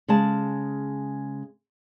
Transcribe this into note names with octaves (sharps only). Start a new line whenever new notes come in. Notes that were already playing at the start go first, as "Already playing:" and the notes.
C#3 G#3 A5